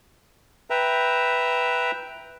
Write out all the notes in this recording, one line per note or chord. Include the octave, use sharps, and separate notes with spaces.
B4 E5 G5 A#5